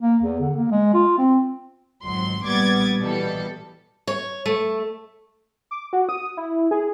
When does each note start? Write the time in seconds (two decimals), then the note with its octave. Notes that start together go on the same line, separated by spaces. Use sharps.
0.01 A#3
0.23 E2
0.40 D3
0.56 A#3
0.71 G#3
0.94 F4
1.18 C4
2.03 G#1 F2 F#3 C6
2.43 A#1 G3 B3 D6 G#6 A6
2.99 B2 E3 G3 A4
4.07 C#5
4.46 A3
5.71 D6
5.93 F#4
6.09 D#6
6.37 E4
6.71 G#4